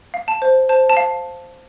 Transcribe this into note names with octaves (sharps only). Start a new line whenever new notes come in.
F5
A5
C5
C5 A5
A5
F5